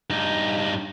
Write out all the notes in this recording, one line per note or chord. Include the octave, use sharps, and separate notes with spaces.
G2 D#4